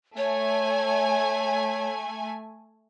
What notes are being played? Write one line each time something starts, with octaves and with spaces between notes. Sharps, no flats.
A3 C#5 G#5